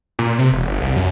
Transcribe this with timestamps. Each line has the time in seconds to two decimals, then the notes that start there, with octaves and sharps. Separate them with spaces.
0.19 A#2
0.38 C3
0.52 E1
0.68 G1
0.81 C2
0.96 F#2